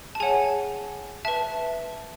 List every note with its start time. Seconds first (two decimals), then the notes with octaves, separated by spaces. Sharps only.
0.15 A5
0.20 G#4 C#5 F#5 G#5
1.25 B4 E5 A5